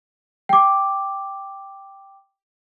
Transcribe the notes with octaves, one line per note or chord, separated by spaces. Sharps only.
G5 D6